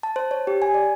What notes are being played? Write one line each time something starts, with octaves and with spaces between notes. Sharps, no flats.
A5
C5
C#5
G4
G#5
D5